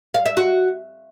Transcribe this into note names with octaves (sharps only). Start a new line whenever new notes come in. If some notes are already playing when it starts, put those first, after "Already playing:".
F5
E5
F#4